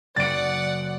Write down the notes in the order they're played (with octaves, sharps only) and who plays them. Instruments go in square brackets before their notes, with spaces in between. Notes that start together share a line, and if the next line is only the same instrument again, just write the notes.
[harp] F#1 [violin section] D5 F#5 [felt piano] A6 D7